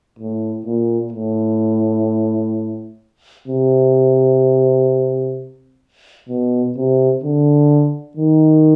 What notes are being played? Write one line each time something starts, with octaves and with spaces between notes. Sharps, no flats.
A2
A#2
A2
C3
B2
C3
D3
D#3